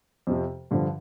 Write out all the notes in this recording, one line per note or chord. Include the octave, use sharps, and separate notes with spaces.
F2 C3 F3
G2 D3 F3